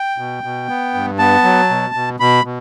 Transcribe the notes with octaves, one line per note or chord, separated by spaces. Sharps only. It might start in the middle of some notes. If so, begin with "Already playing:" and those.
Already playing: G5
B2
B2
B3
G2
B3 A5
F#3
B2
B2
B2 B5
B2